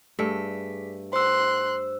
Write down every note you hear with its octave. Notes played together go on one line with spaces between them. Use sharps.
G2 A3 G#4 B6
C5 C6 E6 F#6